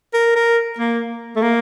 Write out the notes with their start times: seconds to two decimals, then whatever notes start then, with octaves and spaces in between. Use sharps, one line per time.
0.14 A#4
0.36 A#4
0.78 A#3
1.36 A3
1.42 A#3